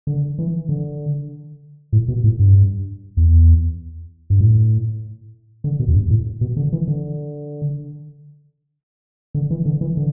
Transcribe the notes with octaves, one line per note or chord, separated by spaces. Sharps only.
D3
E3
D3
A2
B2
A2
G2
E2
G2
A2
D3
B2
E2
G2
A2
B2
D3
E3
D3
D3
E3
D3
E3
D3